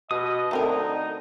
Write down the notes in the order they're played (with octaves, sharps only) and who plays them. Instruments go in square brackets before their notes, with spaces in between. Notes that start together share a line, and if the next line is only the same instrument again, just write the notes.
[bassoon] B2 [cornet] D#5 [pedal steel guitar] D#6
[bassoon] D3 [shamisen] A3 C4 A#4 [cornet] D#4